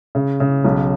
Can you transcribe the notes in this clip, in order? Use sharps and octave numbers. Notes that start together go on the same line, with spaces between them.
C#3
C#3
B1